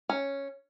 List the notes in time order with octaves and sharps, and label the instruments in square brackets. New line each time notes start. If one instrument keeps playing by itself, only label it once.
[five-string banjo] C#4